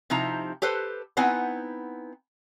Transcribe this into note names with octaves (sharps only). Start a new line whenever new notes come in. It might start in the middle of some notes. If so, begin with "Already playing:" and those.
C3 F3 D#4 E4 A#5
G4 A4 B4 C5
B3 C4 D#4 E4 F#5 G#5